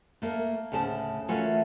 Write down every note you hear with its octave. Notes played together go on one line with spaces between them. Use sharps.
A3 A#3 A#4
D2 A2 C#3 A5
E3 A3 C#4 F4 F#4 A#4